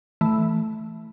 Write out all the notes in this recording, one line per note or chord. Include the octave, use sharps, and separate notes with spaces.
E3 A3